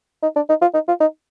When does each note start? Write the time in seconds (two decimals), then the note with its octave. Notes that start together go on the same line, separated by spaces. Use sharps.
0.23 D#4
0.36 D4
0.49 D#4
0.62 F4
0.74 D#4
0.88 F4
1.00 D#4